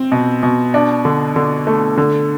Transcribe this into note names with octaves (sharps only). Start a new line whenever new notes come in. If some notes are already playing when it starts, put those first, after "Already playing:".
Already playing: C4
B2
B2
D4
D3
D3
A3
D3